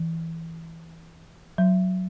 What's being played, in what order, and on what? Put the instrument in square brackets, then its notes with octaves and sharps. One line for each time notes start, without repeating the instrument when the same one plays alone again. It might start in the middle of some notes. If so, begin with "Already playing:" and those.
Already playing: [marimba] E3
F#3